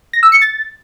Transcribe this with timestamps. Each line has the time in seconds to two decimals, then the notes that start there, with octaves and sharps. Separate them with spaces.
0.13 A#6
0.23 E6
0.32 C#7
0.41 A6